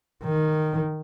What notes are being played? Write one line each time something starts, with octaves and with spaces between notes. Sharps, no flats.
D#3